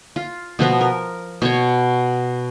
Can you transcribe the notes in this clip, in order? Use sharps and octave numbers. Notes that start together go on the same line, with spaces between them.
F4
B2 F3 B3 A#5
A#4
B2 C#5